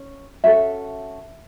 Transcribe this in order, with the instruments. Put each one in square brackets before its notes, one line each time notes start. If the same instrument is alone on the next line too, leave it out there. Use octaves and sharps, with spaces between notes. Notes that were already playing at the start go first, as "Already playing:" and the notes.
Already playing: [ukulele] C#4
C#4 F#4 A4 E5